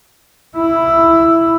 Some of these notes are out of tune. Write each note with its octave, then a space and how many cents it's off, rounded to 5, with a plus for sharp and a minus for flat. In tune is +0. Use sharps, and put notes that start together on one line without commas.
E4 +5